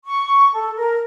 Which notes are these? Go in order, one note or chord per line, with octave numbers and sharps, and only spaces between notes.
C#6
A4
A#4